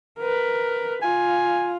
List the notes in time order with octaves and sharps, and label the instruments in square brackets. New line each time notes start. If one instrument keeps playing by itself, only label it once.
[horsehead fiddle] A#4 B4
[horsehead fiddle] F4 [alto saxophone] G#5